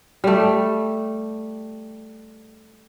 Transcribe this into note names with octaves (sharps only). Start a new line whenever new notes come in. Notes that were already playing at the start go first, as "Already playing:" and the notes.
G3 A3